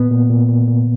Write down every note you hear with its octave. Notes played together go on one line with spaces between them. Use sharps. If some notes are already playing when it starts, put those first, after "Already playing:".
Already playing: A#2 B3
A#2
A#2
A#2
A#2